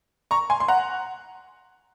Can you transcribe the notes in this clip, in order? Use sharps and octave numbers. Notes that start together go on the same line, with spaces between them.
A#5 C#6
G#5 C6
C6
F#5 A#5